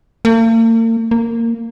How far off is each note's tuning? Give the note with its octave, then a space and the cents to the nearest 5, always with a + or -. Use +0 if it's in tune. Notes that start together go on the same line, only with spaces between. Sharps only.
A#3 -45
A#3 -15